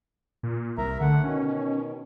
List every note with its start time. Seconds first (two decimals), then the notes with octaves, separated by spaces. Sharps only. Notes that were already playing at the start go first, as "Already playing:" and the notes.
0.43 A#2
0.78 C2 A#4 E5 A#5
1.01 D3 A3 F#5
1.24 B2 D#3 C#4